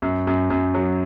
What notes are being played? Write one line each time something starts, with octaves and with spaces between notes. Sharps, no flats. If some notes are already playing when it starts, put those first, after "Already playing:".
F#2
F#2
F#2
F#3